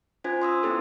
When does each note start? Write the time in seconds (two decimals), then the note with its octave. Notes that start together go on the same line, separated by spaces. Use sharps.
0.24 C#4 F4 C5 G#5 G#6
0.42 C6 D#6 E6
0.63 B3 C#4 E4 G4 A4